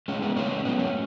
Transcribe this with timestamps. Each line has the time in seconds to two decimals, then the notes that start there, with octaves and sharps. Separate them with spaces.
0.08 A2 G#3 C#4
0.22 B3
0.36 A2 G#3 C#4
0.65 A2 F#3 B3
0.79 C#4